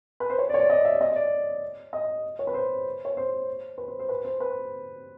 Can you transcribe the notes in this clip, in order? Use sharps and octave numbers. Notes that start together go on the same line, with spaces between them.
B4
C5
C#5
D5
C#5
D5
D#5
E5
D#5
D5
D#5
C#5
B4
C5
C#5
C5
B4
C5
C5
B4
C5
B4